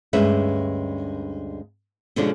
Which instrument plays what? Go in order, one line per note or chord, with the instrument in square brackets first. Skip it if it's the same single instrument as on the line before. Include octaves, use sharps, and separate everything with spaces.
[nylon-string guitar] D2 G2 G#3 C#4 B4 E5
B2 D3 F3 G#3 C#4 D4